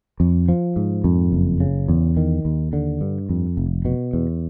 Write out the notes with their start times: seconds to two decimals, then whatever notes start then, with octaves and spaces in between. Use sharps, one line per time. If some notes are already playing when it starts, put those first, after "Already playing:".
0.20 F2
0.49 F3
0.76 G#2
1.04 F2
1.32 F#1
1.60 C#3
1.88 E2
2.17 D#3
2.45 D#2
2.73 D3
3.01 G2
3.29 F2
3.57 F1
3.85 B2
4.13 E2